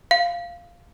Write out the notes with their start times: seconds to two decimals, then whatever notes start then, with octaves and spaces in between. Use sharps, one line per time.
0.11 F5